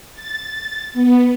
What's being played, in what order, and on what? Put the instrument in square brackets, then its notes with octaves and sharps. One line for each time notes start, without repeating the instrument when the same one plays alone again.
[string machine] A6
B3